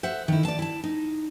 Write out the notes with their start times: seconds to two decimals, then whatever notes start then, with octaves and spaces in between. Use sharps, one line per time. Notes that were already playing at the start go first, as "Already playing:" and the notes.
0.03 C5 E5 F#5
0.28 D#3 E4
0.45 D5 A5
0.59 E4 A5
0.84 D#4